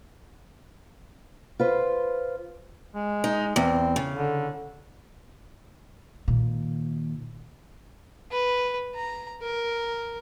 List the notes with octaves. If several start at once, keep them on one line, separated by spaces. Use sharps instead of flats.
F4 B4 C5
G#3
D#4
E2 C4
C#3
D3
A#2 D#3
B4
A#5
A#4